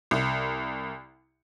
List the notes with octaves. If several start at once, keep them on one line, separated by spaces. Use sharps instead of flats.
C2